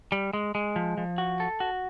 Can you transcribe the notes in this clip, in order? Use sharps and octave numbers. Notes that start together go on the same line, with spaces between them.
G3
G#3
G#3
F3
F3
F#4
A4
F#4